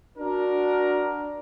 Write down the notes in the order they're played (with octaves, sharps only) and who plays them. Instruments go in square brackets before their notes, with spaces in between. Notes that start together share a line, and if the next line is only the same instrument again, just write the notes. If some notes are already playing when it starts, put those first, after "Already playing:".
[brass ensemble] D4 F#4 A#4